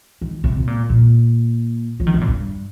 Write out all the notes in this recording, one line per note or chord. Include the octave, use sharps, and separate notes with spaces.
D#3
C3
C3
A#2
A#2
F3
D#3
C3
A#2
G2